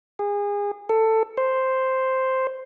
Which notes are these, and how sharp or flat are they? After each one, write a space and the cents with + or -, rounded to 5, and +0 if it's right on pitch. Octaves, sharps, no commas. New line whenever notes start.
G#4 -30
A4 +15
C5 +0